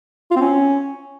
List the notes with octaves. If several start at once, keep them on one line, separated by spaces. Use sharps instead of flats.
F4
C4
C#4